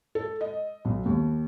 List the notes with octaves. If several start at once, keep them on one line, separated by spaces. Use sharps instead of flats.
A4
D#5
B1
D#2